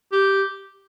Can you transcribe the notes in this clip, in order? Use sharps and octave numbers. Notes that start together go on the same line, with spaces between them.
G4